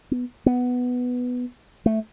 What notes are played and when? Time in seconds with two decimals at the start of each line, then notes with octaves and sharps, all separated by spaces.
0.11 B3
0.46 B3
1.86 A3